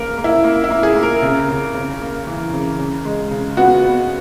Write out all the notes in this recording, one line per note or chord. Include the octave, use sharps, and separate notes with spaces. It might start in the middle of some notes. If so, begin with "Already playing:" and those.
Already playing: C#3 A#3 A#4
A#3
E4
A#3
E4
A#3
G#4
A#3
A#4
C#3
C#3
C#3
A#3
E3
C#3
C#3
G#3
C#3
B3 F#4
B3